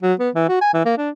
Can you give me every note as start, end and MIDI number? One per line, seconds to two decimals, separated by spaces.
0.03 0.13 54
0.20 0.30 59
0.35 0.44 52
0.49 0.59 66
0.61 0.71 80
0.74 0.83 52
0.85 0.98 58
0.98 1.10 62